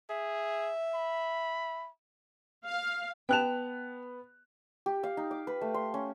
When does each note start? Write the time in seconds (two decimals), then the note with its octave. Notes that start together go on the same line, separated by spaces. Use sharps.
0.10 G#4 E5
0.95 B5
2.66 F5
3.29 B3 G5 A5 F#6 F7
4.86 G4
5.03 F5
5.17 D#4
5.31 D6
5.47 B4
5.61 A3
5.74 C6
5.94 C#4